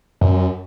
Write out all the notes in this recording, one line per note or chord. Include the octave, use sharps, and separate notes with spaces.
F#2